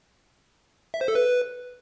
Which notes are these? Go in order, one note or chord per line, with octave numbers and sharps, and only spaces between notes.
E5
C5
A4
B4